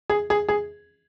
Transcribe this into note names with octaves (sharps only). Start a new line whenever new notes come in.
G#4
G#4
G#4